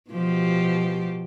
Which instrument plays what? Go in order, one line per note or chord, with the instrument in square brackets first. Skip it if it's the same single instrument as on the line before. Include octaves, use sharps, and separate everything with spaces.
[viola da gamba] B2 F3 G4